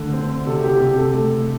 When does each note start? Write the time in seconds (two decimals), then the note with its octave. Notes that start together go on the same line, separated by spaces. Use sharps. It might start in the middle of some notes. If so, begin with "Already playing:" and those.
Already playing: D3 A3
0.13 C4
0.46 C3 A4
0.64 G4
0.80 C3 G4
0.97 A4
1.13 A3